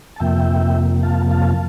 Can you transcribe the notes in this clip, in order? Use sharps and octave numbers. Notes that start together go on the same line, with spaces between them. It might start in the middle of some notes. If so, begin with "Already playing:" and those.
A5
F2 C3 F3 A#3 E5 G5
F5 A5
F5 A5